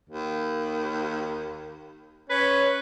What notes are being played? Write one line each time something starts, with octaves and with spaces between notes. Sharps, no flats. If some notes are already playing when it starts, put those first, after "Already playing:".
D#2
C#4 B4